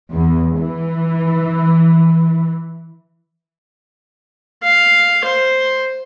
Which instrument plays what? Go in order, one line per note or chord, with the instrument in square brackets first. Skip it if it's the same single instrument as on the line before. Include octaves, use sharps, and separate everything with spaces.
[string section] E2
E3
[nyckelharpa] F5
C5